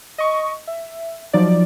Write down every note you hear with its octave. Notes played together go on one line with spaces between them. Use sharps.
D#5 C#6
E5
F3 F#3 D#4 D5